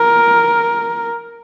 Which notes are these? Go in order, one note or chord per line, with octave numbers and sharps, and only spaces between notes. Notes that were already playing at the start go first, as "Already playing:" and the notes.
Already playing: A#4